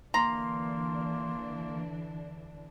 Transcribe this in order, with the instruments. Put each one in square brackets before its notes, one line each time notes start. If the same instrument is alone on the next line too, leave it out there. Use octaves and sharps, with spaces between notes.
[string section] D3 E3 D4 [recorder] A#3 [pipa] A#5 [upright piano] C6